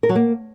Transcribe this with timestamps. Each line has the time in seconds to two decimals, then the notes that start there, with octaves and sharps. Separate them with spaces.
0.03 A#4
0.09 F#3
0.15 A#3